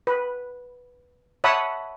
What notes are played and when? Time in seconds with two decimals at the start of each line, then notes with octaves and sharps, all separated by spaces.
0.07 B4
1.44 C#5 E5 F#5 A5 B5 D#6